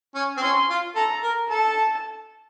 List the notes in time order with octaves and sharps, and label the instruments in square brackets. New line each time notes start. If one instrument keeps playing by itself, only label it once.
[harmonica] C#4
C4
[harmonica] C#4 [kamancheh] C6
[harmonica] F4
[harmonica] A4 [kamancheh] A#5
[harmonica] A#4
[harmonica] A4 [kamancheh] A5